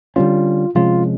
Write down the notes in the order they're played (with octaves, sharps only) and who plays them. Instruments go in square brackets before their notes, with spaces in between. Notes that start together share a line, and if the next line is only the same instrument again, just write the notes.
[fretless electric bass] D3 G3 A#3 C#4 [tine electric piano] F4
[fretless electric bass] C3 F3 G#3 C#4 [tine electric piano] F4